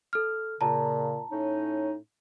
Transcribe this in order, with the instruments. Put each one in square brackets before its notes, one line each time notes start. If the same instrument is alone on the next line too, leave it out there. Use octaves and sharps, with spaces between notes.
[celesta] A4 F6
[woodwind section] A#2 C#3 [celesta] A5 A#5
[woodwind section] A2 C#4 D#4